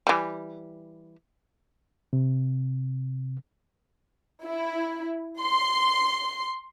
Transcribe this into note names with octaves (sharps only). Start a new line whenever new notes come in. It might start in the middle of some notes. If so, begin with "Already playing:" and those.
E3 G3
C3
E4
C6